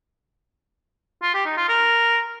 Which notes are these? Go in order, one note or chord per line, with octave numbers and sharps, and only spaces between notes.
F4
G4
D#4
F4
A#4